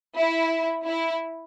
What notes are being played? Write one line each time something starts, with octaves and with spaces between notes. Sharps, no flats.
E4
E4